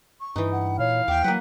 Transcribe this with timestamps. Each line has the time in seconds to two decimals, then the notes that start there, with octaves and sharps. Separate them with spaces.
0.21 C#6
0.36 G2 E3 D#4
0.52 F#5
0.79 A#2 C#5 F5
1.08 D#2 E5 G5 D6
1.24 F#3 A#3 B4 F#5